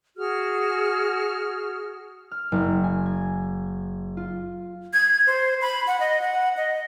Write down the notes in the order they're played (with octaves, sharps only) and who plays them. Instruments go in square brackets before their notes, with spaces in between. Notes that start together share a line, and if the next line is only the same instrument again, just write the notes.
[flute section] F#4 G#4 F6
[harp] F6
F#1
G#5
G#6
F4
[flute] G#6
C5
B5
F#5
D#5
F#5
D#5